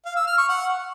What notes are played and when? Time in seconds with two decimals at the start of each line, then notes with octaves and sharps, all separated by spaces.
0.05 F5
0.16 E6
0.27 F6
0.38 C#6
0.49 F#5